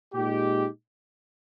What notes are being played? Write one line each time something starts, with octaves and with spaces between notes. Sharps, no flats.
A#2 G#3 D#4 G4